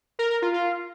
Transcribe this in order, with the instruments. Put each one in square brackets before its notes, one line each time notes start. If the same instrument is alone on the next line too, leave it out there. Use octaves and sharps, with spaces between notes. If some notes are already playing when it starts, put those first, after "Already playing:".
[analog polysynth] A#4
A#4
F4
F4